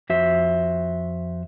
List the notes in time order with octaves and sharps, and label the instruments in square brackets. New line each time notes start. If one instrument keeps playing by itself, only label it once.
[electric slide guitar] F2 F#4 C5 E5